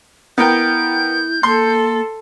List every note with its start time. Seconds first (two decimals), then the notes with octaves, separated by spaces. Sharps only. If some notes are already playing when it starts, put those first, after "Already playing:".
0.38 B3 E4 A#4 G5 G6
1.43 A#3 A4 C6